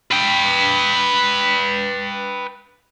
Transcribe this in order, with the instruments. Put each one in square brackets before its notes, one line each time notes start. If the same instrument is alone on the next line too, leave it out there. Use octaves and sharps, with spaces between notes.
[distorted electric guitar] B4 G5